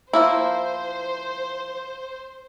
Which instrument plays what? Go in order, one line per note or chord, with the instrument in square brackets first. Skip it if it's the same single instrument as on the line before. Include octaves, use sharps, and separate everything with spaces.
[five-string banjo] F3 A#3 E4 [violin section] C5